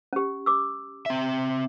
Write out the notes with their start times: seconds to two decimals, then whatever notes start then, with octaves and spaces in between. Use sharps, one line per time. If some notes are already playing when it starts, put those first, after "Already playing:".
0.13 C#4 G4
0.46 D6 E6
1.06 C4 E5